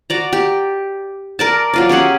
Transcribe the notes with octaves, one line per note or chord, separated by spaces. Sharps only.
F#4 D5 A#5
G4
A#4 D5 A5
F#3 F4 D5
C#4 G4 G#4 F#5